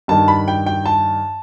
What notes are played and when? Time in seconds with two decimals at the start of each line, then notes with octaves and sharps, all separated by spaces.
0.08 G2 D#3 A5
0.28 B5
0.48 G5
0.66 G5
0.86 A5